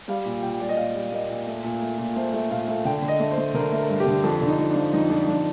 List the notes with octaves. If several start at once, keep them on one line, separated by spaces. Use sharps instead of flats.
G3 F5
A#2
A#2 G5
G3 D5
D#5
A#2 F5
G3
A#3 D#5
A#2
A3
A#2
A3
A#2
A3 C5
A3
A#2 F5
A3
D3 G5
D3
D#5
A3
C5
A3
D3 A#4
A3
A#4
G2
G4
D3
F2 A4
D3
D#4
F2
D4
F3
F2 D#4
F2 D4
F2 D4